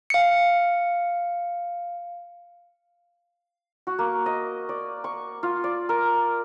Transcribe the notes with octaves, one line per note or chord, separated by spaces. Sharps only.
F5 C#7
F#4
A#3
D#5
D5
C#6
F4
D5
A#4